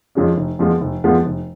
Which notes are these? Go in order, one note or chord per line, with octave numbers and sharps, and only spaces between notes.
F2 F3 G#3 C#4
F1
F2 F3 G#3 B3
F1
F2 F3 G#3 B3
F1